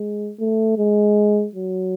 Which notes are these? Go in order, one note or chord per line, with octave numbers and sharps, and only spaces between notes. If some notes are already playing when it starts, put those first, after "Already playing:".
Already playing: G#3
A3
G#3
F#3